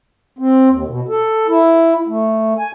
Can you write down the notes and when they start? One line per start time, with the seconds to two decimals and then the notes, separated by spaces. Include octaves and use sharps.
0.39 C4
0.69 D#2
0.87 B2
1.08 A4
1.48 E4
2.08 A3
2.58 G#5